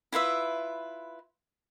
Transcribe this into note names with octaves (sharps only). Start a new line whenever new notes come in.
E4 F4 B4 E5